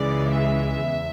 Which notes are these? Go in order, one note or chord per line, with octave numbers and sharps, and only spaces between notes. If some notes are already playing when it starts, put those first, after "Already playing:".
Already playing: C#2 C#3 E3 G#3 D5
E5
E2